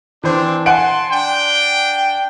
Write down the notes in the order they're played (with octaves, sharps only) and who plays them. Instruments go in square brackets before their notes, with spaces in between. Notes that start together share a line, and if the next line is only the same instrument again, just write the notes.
[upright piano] E3 C5 [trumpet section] C4 D4
[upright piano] F#5 G#5 D7 [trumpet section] A5 C6
[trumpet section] D4 G5